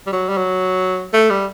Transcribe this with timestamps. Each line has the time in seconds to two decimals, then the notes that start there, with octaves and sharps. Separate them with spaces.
0.07 G3
0.13 F#3
0.29 G3
0.37 F#3
1.14 A3
1.30 G3